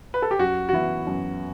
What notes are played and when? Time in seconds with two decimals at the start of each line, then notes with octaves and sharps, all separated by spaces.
0.14 B4
0.22 A4
0.31 G4
0.39 F#2 F#4
0.69 F#4
0.73 E3 B3 E4
1.07 F#2